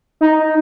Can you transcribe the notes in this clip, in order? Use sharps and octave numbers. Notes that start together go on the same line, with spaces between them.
D#4